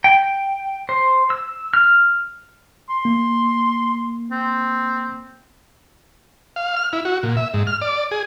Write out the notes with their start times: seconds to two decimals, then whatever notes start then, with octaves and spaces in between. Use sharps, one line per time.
0.04 G5
0.89 C5
1.30 E6
1.74 F6
2.90 C6
3.05 A#3
4.31 C4
6.56 F5
6.76 F6
6.93 E4
7.05 F#4
7.23 A#2
7.37 E5
7.54 G#2
7.67 F6
7.82 D5
8.11 G#4